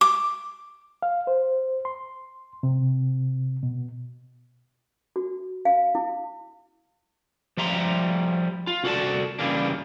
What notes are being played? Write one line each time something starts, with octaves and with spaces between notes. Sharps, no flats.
D6
F5
C5
C6
C3
B2
F#4
F5
E4
F3 G3 E5 A#5 C6
F4
C2 F#4 A4 D5 A5
C#3 E3 G3 A#3 D4